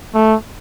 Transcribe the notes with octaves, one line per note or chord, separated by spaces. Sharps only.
A3